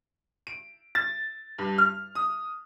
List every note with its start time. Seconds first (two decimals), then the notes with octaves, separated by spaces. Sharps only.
0.47 D7
0.95 A6
1.58 G2
1.78 F6
2.15 D#6